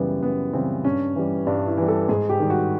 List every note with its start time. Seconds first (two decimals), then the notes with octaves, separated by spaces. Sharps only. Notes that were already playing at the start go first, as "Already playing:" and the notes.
Already playing: F#2 C#3 E3 G3 B3
0.22 F#2 B3
0.53 C#3 E3 G3 C4
0.84 G2 C#4
1.16 E3 G3
1.47 G2 D4
1.67 E4
1.77 E3
1.83 G3
1.88 A4
2.09 G#2 G#4
2.30 G4
2.40 D#3 G3
2.50 F#4